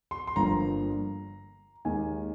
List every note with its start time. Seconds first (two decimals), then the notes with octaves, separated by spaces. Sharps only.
0.11 C6
0.27 C6
0.36 G1 G2 F3 A#3 A#5
1.85 D#2 D#3 G#3 G#5